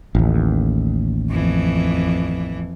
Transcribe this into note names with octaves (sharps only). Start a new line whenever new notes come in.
A1 D#2
F2 E3